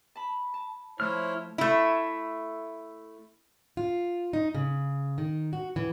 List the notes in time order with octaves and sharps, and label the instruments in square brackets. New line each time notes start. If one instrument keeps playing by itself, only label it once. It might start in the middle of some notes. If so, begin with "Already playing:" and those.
[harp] A5 B5
A5
[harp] F3 A3 [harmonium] E4 C5 C#5 [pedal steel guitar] F6
[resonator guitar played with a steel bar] A3 E4
[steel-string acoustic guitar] F4
D#4
C#3
D#3
F#4
E3